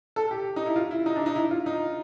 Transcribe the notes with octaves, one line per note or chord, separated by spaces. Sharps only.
A4
G4
D#4
E4
F4
E4
D#4
D4
D#4
E4
F4
D#4